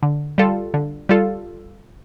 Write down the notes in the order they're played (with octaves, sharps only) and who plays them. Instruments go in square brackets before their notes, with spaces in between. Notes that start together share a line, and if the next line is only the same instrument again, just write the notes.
[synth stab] D3
G3 F4 A4
D3
G3 F4 A4